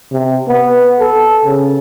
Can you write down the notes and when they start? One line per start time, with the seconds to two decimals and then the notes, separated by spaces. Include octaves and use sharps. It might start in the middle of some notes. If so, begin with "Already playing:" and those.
0.12 C3
0.48 B3
1.00 A4
1.45 C#3